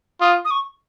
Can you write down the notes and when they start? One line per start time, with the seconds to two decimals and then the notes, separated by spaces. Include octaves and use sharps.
0.21 F4 D#6
0.44 D#6
0.50 C#6